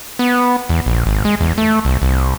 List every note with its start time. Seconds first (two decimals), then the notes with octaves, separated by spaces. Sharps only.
0.19 B3
0.69 E2
0.86 A#1
1.06 G#1
1.25 G#3
1.41 E2
1.58 A3
1.85 C2
2.02 C2